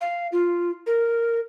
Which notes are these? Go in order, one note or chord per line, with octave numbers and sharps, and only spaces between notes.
F5
F4
A#4